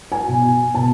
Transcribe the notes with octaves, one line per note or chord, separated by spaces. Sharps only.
G#5
B2
B2 A5